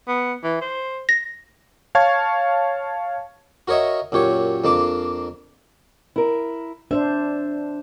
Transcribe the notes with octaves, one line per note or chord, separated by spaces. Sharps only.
B3
E3
C5
A#6
C#5 F5 A5 C#6 G#6
F#4 A#4 C#5 D#5 E5
F#2 A#2 G4 C#5
F2 A#3 D4 D6
E4 A#4
D4 C5 E5